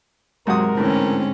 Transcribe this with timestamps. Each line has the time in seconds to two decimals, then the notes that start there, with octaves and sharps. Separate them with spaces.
0.47 G#2 C3 F#3 F#4 A#4 D#6
0.77 A2 D3 E3 C4 C#4